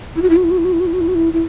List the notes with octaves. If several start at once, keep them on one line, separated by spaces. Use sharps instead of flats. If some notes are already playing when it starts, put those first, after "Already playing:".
E4
F#4
E4
F#4
E4
F#4
E4
F#4
E4
F#4
E4
F#4
E4
F#4
E4
E4